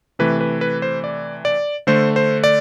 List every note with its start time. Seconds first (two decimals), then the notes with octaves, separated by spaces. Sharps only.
0.19 C3 E3 A3 B4
0.41 B4
0.61 B4
0.82 C5
1.04 D5
1.45 D5
1.87 D3 A3 C5
2.16 C5
2.44 D5